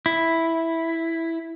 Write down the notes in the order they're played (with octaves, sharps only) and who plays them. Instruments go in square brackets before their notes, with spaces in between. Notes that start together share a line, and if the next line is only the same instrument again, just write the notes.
[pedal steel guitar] E4